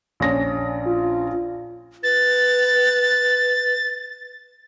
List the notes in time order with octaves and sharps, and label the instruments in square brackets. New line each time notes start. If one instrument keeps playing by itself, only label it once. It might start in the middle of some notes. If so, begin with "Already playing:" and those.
[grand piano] A#1 C#4 A#6
[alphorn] F4
[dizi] B4 [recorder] A6